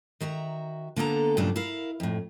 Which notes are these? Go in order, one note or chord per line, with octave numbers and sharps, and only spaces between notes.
D#3 F#4 E5 A#5
D3 A#3 B3 A4 A#5
G2 A#2 C#3 F#3 A3 D4
E4 A#4 F5
F2 A2